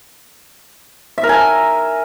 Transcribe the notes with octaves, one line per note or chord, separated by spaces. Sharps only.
E5
A#4
G#5